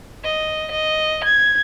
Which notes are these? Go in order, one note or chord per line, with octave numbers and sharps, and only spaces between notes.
D#5
D#5
G#6